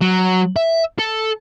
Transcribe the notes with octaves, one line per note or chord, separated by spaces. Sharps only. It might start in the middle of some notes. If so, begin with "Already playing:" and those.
F#3
E5
A4